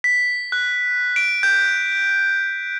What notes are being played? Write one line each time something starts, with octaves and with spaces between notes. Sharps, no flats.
B6
F#6
D7
G6